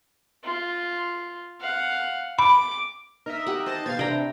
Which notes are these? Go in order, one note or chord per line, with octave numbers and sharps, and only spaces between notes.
F4
F5 F#5
B5 D6
D#4 A#4 D#5 E5
G4 F#5
C5 D#5 A5
B2 D#3 B3 C5 F5 G#6 A6
C3 D4 E4 A4 G5 A#5